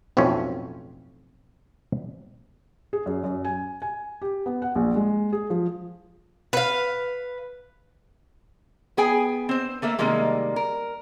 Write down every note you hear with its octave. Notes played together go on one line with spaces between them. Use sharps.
B1 F2 A2 C4 C#4
G#4
F#2
F#2
G#5
G#5
G4
B3
F#5
A#1
G#3
G#4
F3
B4 F5
B3 G#4 G5 G#5
C4 C5
A3 A#3 A4 E5
C3 D#3 G3 G#3 A#3
A#4